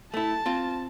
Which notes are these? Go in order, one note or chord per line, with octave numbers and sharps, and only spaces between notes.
A3 E4 A5
C4 F4